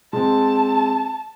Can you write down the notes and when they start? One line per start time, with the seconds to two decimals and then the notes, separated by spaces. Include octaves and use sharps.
0.13 G#3 C4 A5